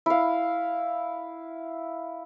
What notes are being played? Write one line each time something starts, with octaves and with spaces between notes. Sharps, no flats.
E4 F5